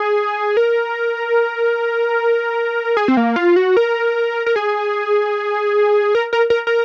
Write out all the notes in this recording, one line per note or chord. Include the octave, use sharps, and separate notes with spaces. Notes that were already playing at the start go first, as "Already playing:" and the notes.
Already playing: G#4
A#4
G#4
C4
A#3
F4
F#4
A#4
A#4
G#4
A#4
A#4
A#4
A#4